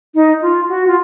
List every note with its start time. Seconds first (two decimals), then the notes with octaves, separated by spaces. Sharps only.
0.15 D#4
0.42 F4
0.68 F#4
0.87 F4